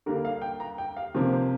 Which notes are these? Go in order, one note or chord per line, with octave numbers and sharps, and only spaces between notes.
D3 G3 A#3 A#4
F5
G5
A#5
G5
F5
C3 F3 A#3
C5